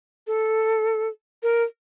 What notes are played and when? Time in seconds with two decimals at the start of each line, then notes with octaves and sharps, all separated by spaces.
0.27 A4
1.43 A#4